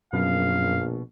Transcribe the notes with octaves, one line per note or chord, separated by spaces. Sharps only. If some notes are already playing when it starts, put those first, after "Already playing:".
A#1 F#2 B2 F5